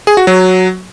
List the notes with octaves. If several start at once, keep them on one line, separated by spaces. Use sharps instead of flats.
G#4
F#4
F#3